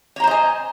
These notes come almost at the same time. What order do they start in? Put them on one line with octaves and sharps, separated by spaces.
C#5 A#5 C5 D#5 G#5